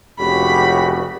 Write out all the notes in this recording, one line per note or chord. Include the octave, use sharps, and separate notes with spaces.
F1 C#2 C#3 F#4 G4 B5